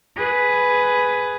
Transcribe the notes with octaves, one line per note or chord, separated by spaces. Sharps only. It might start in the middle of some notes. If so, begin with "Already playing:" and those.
G#4 B4